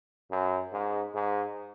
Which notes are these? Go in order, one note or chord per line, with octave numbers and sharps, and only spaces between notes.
F#2
G#2
G#2